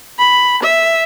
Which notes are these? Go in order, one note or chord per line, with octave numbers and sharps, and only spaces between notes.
B5
E5